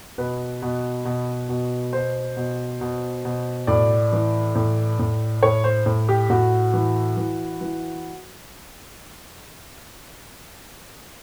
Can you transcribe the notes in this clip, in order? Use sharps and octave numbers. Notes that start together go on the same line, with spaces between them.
B2 B4
B2
B2
B2
B2 C5
B2
B2
B2
A2 D5
E3
A2
A2
A2 C#5
C5
A2
G4
A2 F#4
E3
E3
E3